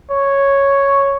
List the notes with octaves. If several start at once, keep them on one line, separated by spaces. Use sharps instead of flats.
C#5